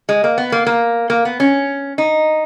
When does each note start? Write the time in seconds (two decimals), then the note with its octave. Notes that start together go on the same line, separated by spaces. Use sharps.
0.09 G#3
0.24 A#3
0.38 B3
0.52 A#3
0.66 A#3
1.10 A#3
1.25 B3
1.40 C#4
1.98 D#4